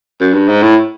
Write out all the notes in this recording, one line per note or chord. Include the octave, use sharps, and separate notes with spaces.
F#2
G2
G#2
A2